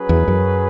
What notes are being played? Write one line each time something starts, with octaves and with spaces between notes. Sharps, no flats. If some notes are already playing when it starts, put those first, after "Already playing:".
Already playing: F#3 C#4 G#4 B4
E2
F#2